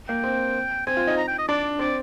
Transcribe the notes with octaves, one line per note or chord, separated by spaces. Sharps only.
A#3 G5
C4
C4 G#5
F4
D#4
A#5
G5
D#5
D4 D5
C4 D5